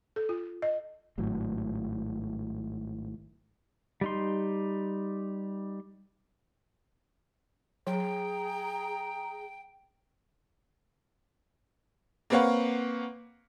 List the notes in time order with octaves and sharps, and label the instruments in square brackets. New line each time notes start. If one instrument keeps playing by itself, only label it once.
[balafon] A4
F4
D#5
[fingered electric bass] G#1 A2 F#3
[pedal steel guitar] G3 D#4 C6
[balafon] F#3 [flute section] G#4 A#5 [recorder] G5
[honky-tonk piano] A#3 C4 B4 C#5 F5 F#5